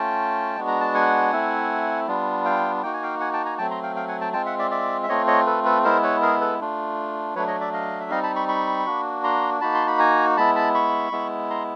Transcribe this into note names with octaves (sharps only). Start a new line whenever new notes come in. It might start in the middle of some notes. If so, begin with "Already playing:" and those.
Already playing: A3 C#4 F4 G5 A5
G#3 B3 D4 F#4
A#5
A5
F#5 G#5
A3 C4 E4
G3 B3 D4 F4
F5 G5
A#3 D#4 F#4 G5
G#5
F5 G5
F#5 G#5
G5 A5
G#5 A#5
F#3 A3 C4 G5 A5
A#5 C6
F5 G5
F5 G5
F#5 G#5
G5 A5
G#3 C4 F4 G5 A5
E5 F#5
D5 E5
D5 E5
E5
A3 C4 F4 C#5 D#5
C#5 D#5
A4 B4
A4 B4
G#3 B3 E4 A#4 C5
B4 C#5
G#4 A#4
A4 B4
A3 D4 F4
F#3 A3 D4 B4 C#5
C#5 D#5
D5 E5
D#5 F5
E5
G3 C4 D#4 D#5 F5
A5 B5
B5 C#6
B5 C#6
A#3 D4 F#4
A#5 C6
A#3 D#4 F#4 A5 B5
C6
B5
G#5 A#5
G#3 B3 E4 A5 B5
A5 B5
B5 C#6
G#3 B3 E4
A#5 C6